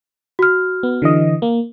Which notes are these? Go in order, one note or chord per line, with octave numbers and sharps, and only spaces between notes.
F#4 F6
B3
D3 E3 D#5
A#3